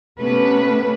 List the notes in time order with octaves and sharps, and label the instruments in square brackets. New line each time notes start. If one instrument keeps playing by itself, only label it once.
[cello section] C3 A3 B3 C#4 B4